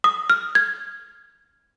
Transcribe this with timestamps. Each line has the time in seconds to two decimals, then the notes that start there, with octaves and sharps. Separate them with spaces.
0.04 D#6
0.30 F6
0.55 G#6